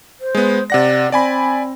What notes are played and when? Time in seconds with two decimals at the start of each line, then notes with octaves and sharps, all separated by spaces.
0.21 C5
0.35 G#3 B3
0.70 C3 D5 F#5 A#6
1.12 C4 D5 G#5 B5